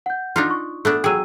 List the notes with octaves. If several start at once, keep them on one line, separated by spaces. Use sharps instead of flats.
F#5 G6
D4 D#4 F4
C#6
A3 B3 D4
F#3 G#4 G5 E6 D#7